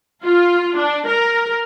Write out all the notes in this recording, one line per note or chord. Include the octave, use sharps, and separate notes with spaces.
F4
D4
A#4